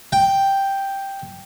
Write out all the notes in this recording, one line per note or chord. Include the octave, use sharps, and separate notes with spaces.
G5